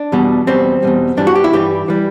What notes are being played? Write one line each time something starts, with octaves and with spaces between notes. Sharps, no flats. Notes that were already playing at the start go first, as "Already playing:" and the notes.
Already playing: D4
E2 B2 G3
E2 B2 G3 C4
E2 B2 G3
G2 E3 G3 D4
F#4
G4
E4
G2 E3 G3 G4
E3 G3